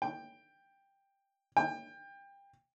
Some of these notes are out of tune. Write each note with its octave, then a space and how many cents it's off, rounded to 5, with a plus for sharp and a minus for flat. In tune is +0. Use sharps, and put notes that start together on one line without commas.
G5 +10
G5 +25